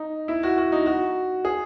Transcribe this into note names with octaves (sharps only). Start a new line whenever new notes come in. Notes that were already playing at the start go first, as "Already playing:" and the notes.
Already playing: D#4
E4
F#4
F#4
D#4
F#4
G#4